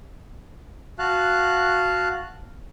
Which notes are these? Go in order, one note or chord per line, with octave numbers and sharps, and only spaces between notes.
F#4 F5 A5 F#6